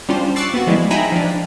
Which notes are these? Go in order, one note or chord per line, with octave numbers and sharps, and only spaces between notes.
G3 C#4 D4 F4 C5
C#6 D6 E6 F#6 A6 C7
B3 F#4
F3 G3 G#3 E4
D#4 E5 G5 G#5 A#5 B5
F3 D4